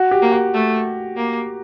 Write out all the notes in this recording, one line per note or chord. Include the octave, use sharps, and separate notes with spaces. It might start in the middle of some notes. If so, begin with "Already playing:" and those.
Already playing: F#4
G4
A#3
F#4
A3
A#3